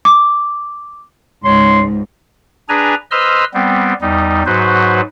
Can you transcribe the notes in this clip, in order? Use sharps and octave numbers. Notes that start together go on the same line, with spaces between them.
D6
C#2 G#2 C#5 C6
D4 G#4 B4 G#5 A#5
B4 C5 D#5 C6 E6 F6
G3 B3 C4
E2 G3 D#4
G#2 F#3 F#4 B4 C5